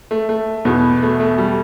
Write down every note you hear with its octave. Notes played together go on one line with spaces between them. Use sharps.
A3
A3
E2 B2 B3
A3
A3
G3